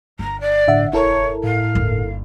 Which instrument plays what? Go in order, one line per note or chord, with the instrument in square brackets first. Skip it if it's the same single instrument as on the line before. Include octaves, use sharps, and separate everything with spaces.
[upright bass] G1 [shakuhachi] A#5
[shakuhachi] D5
[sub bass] A2 [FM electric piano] D3 E5 F#5
[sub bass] E1 [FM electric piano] E4 A4 A#4 [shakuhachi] C#5
[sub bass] A2 [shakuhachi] F5
[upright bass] G1 D#2